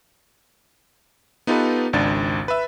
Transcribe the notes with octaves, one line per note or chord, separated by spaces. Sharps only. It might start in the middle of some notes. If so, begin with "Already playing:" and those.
B3 D#4 F4 G4 A4 B4
G#1 C#2 D4 A6
B4 E5